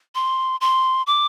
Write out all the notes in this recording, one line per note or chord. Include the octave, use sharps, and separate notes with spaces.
C6
C6
D6